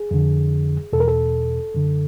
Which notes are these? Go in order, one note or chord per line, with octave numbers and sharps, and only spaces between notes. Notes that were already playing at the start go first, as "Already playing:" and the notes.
Already playing: G#4
F2 D3
E2 B2 A4
A#4
A4
F#2 D3